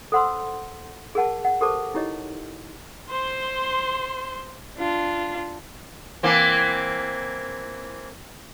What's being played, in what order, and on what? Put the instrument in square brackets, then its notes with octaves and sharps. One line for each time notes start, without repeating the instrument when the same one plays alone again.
[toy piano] A4 C5 F#5 B5 C6 E6
G#4 A#4 F#5 A5
F#5
G4 A4 A#4 C5 A5 D6
D#4 E4 G4 C#5 D#5
[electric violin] C5 C6
[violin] D4 F4
[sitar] E3 A#3 C4